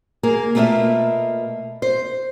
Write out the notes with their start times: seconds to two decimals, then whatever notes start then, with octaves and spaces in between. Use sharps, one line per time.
0.23 A#3 G#4 A#4
0.55 B2 A3 A#3 E4 F4 E5
1.82 C5